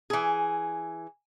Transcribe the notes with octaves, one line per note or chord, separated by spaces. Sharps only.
E3 G#4